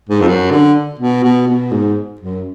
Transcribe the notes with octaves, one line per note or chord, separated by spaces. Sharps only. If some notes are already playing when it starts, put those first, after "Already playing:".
G#2
F2
F#2
D3
B2
B2
B2
G#2
F#2